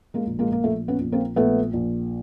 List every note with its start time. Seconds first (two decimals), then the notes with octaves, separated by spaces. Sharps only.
0.14 G#3 A#3
0.27 A#1
0.39 G#3 A#3
0.52 A#3
0.64 A#1 A3
0.88 B3 C#4
1.00 A#1
1.12 A#3 C4
1.36 A#1 A3 B3
1.73 A#1